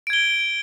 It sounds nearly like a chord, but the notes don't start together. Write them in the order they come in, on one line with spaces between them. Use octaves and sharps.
D7 G#6 G7